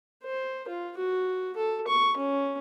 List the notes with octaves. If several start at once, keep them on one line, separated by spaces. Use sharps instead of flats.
C5
F4
F#4
A4
C#6
C#4